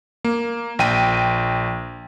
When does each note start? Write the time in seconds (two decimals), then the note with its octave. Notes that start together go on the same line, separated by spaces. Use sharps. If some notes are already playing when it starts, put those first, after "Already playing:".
0.25 A#3
0.79 A#1 G5 D#7